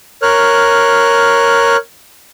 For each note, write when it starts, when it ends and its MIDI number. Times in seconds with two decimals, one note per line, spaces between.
0.22 1.77 70
0.22 1.77 73
0.22 1.77 89
0.22 1.77 90